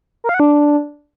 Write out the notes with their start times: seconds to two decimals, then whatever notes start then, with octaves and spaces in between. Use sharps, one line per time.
0.24 A#4
0.29 F5
0.34 F#5
0.40 D4